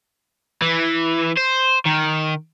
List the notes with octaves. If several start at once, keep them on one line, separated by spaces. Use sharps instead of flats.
E3
C5
D#3